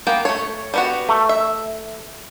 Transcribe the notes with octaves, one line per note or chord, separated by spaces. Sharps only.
A#3 B3 G5
A3 C#5
G3 B3 F#4
A3
E5